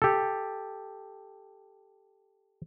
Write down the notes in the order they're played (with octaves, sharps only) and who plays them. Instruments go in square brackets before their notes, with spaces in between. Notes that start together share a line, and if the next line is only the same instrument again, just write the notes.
[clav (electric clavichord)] G4 A4